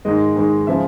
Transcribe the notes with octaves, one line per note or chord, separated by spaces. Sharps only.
G#2 D#3 G#3 D#5
G#2 D#3 G#3
C#3 F3 G#3 E5